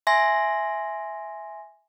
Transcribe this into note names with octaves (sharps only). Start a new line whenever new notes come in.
E5 G#5 C6 A#6